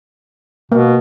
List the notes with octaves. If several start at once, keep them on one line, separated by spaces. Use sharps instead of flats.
B2 A#3